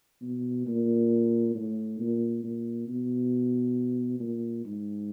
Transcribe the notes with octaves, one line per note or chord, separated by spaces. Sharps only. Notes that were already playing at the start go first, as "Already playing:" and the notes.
B2
A#2
A2
A#2
A#2
B2
A#2
G#2